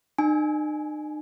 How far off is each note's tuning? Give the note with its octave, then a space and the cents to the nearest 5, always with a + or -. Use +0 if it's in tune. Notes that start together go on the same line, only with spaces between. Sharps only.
D#4 -45 G#5 +0